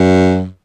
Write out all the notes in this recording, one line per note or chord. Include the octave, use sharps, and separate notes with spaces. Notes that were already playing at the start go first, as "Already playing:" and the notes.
Already playing: F#2